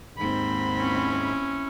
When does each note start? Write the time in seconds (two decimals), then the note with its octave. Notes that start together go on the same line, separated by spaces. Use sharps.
0.17 D#2 G#2 C4 B5
0.79 C#4 E4